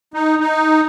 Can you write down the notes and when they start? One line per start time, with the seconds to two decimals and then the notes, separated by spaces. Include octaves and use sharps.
0.14 D#4
0.40 D#4